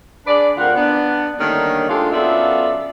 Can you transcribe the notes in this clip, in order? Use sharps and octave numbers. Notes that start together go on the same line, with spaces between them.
D4 G#4 B4 D5
D2 C4 F4 A#4 F#5
B3 D4
D3 D#3 G3 A3 A#3 C#4
G#3 D4 F4 G4 A4
F#2 B3 F4 A4 D5 E5